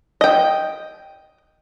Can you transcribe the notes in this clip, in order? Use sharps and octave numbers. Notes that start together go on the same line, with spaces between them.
D#5 G5